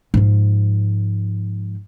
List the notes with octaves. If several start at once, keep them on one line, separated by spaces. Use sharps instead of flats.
G#2 F3